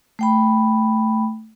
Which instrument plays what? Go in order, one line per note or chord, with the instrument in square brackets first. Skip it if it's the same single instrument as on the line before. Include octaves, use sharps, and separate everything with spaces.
[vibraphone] A3 G5 B5